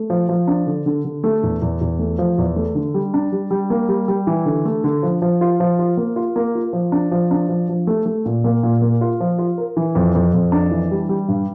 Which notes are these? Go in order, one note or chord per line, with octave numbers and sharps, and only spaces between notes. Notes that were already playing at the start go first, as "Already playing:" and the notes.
Already playing: A3
F3
F3
D4
D3
D3
D3
A3
E2
E2
E2
A3
F3
E2
A3
D3
G3
D4
G3
G3
A#3
G3
G3
E3
D3
A3
D3
F3
F3
F4
F3
F4
A#3
F4
A#3
F4
F3
D4
F3
D4
F3
F3
A3
A3
A#2
A#3
A#2
A#3
F4
F3
F4
A#4
E3
F2
F2
F2
D4
E3
G3
G3
G2